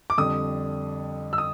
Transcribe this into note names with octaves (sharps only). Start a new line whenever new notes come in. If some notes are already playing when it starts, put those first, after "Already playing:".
D6
F2 D3 G3 D#6
E6
D#6